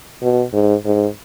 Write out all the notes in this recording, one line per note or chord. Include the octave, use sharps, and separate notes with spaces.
B2
G#2
G#2